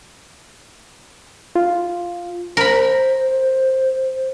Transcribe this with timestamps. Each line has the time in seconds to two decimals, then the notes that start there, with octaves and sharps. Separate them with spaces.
1.55 F4
2.57 A#4 C5 B5